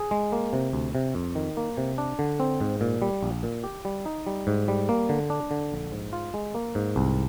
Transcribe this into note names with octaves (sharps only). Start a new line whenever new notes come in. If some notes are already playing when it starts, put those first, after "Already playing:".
Already playing: G#4
G#3
A#3
C3
D2
C3
F2
D#3
A#3
C3
D4
D3
C4
G#2
A#2
G3
A#1
A#2
G4
G3
D#4
G3
G#2
G3
A#3
D3
D4
D3
A#1
G#2
F4
G#3
A#3
G#2
C2